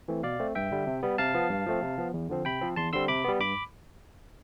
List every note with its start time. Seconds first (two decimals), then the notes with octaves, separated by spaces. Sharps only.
0.08 E3 A3 C4
0.23 B2 D5 F5
0.40 A3 C4
0.55 G2 E5 G5
0.71 D3 G3
0.87 C3
1.03 G3 B3
1.18 C3 F5 A5
1.34 F3 B3
1.50 G2
1.66 F3 A3 C4
1.82 C3
1.98 F3 B3
2.14 E2
2.29 D3 F3 C4
2.45 C3 G5 B5
2.62 F3 C4
2.76 E2 A5 C6
2.93 D3 G3 C4 C6 E6
3.08 C3 B5 D6
3.24 G3 B3
3.40 G2 B5 D6